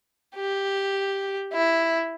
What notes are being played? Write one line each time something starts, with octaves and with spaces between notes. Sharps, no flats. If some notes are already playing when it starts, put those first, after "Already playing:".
G4
E4